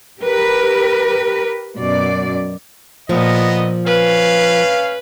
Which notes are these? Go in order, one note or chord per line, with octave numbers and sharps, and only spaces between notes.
G4 A#4 B4
F#2 B2 D5
A#2 F3 B3 D#5
C#4 B4 F5